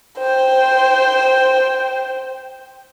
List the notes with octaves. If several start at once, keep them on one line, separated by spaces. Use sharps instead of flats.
C5 G5